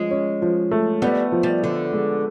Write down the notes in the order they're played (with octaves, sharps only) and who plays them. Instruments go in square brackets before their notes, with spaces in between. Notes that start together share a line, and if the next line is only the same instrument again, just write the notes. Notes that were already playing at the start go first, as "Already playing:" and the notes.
Already playing: [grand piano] F3 C#4 [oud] G#3
[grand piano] C#4
F3
A3
[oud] G3 [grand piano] B3
[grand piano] F3
[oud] G3
[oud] D3 [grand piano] F3
[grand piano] G#3